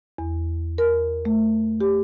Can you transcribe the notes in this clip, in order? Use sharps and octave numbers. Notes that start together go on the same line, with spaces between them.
E2
A#4
A3
G4